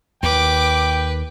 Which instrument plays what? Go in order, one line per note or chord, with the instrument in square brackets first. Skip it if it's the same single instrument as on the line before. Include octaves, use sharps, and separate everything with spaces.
[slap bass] D#2 [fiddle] B4 [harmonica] G5 [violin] D6